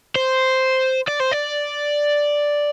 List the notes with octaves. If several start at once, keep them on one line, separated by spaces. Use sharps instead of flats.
C5
D5
C5
D5